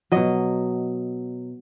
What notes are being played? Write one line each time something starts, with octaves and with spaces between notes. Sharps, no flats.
B2 F#3 D#5